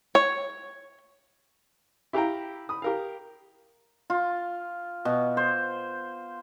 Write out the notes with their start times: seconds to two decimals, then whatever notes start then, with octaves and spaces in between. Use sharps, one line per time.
0.15 C#5
2.13 E4 G4 F5 G5 A#5
2.69 B5 D#6
2.82 G4 A#4 F5
4.10 F4
5.05 B2
5.37 C5